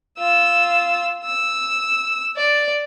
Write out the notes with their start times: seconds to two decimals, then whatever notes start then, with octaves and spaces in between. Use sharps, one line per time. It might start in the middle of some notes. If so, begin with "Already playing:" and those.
0.18 F4 E6
1.24 E6
2.36 D5